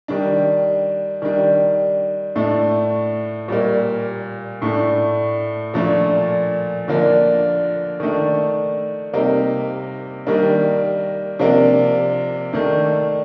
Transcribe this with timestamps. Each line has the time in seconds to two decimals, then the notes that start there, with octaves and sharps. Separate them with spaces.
0.08 D#3 G3 D4
1.22 D#3 G3 D4
2.36 A2 A3 D4
3.48 A#2 G3 A#3
4.62 A2 A3 D4
5.74 A#2 F3 A3 D4
6.88 D3 F3 A#3 D4
8.00 D#3 A3 D4
9.13 C3 G3 A#3 D#4
10.27 D#3 G3 A#3 D4
11.39 C3 F3 A#3 D4
12.53 D#3 A3 D4